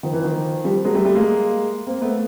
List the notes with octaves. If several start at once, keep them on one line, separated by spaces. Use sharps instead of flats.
D#3 F3
E3
D#3 F3
F3 G3
F#3 G#3
G3 A3
G3 A3
G#3 A#3
A#3 C4
A3 B3